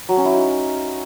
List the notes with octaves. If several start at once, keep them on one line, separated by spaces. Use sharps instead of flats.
F#3
C#4
E4
D#4